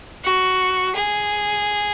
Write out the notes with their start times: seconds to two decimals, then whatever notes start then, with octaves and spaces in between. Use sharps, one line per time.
0.25 F#4
0.96 G#4